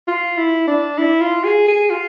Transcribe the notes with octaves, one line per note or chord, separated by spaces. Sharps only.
F4
E4
D4
E4
F4
G#4
G#4
F4